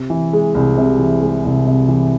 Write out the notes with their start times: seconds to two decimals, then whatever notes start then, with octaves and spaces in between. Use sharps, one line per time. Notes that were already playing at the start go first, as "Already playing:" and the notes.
Already playing: C3
0.10 E3
0.33 G#3
0.55 C2
0.77 C3
0.99 E3
1.21 G#3
1.45 C2
1.66 C3
1.88 E3